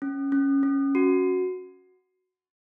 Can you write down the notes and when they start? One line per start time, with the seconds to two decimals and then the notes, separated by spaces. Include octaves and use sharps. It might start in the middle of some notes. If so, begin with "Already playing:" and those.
0.02 C#4
0.32 C#4
0.63 C#4
0.95 F#4